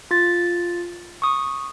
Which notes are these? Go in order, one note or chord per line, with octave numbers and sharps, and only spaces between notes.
F4 A6
C#6 D#6